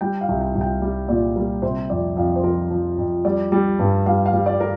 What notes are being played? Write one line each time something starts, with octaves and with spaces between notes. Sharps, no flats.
G3 G5
F5
C2
G5
C2
G5
G3
A#2 D5
G3 A#4
C3 C5
F2 D5
F2 F5
C5
F3 A#4
F3
F2
G3 D5
G3
G2
G3 F5
F5
G3
D5
A#4